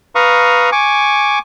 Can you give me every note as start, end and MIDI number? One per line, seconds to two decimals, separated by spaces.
0.15 0.70 71
0.15 0.70 77
0.15 0.70 82
0.15 0.70 85
0.15 0.70 87
0.72 1.39 80
0.72 1.39 85
0.72 1.39 86